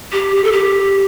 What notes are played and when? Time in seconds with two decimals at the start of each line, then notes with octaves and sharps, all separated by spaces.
0.13 G4
0.36 G4
0.44 A4
0.52 G4